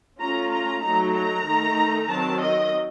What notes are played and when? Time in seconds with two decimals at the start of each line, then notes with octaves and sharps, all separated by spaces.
0.19 A3 C#4 F4 A#5
0.51 A#5
0.83 F#3 A3 D#4 A#5
1.15 A#5
1.47 D#3 A3 D#4
2.09 D#3 F#3 C4 A5
2.41 D#5